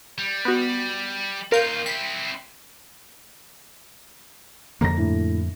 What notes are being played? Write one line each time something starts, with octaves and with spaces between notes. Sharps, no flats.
G3
B3 F#4
D#2 F4 A#4 F5 G6
C4 E4 B6
F2 D3 A#3 A#5 A#6
A2 D4